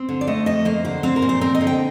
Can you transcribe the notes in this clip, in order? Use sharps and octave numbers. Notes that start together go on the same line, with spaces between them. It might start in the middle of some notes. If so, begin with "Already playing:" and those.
Already playing: C4
D3
D5
A3 D#5
F2 D#5
A#3 C5
D3 C5
C4 C5
A#4
A#2
C5
C4 A#4
D#5
D3
G5